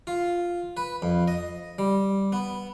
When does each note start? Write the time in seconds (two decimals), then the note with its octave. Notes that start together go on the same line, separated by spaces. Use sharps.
0.07 F4
0.77 B4
1.02 F2
1.28 D#5
1.79 G3
2.32 B3